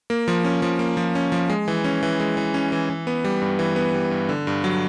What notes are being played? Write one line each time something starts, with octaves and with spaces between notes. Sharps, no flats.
A#3
F3
C#4
F3
A#3
F3
C#4
F3
G#3
E3
C#4
E3
G#3
E3
C#4
E3
E3
B3
G3
G2
E3
B3
G3
G2
D3
G2
F#3